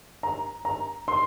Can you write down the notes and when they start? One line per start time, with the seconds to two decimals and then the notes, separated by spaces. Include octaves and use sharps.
0.23 A#5
0.65 A#5
1.08 C6